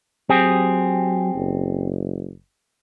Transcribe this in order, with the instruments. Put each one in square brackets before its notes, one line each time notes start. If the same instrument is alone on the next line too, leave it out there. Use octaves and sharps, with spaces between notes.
[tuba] F#3 [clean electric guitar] C4 G4 G#4
[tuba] F#1